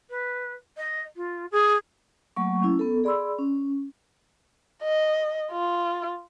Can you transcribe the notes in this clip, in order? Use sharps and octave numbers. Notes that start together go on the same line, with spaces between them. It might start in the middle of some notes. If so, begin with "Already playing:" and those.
B4
D#5
F4
G#4
F#3 A3 A#3 C#6
C#4 E4
B3 A4
G#4 D5 B5 C6 E6
C#4
D#5
F4